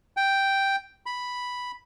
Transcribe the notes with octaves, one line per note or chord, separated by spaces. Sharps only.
G5
B5